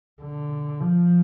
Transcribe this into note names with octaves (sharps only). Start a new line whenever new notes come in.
D3
F3